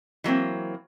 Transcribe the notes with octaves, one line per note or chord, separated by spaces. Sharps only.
E3 F#3 A#3 C4